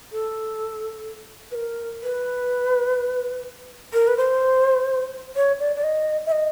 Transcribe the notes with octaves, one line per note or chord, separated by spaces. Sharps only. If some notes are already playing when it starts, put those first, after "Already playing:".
A4
B4
A#4
B4
A#4
B4
C5
C#5
D5
D5
D#5
E5
D#5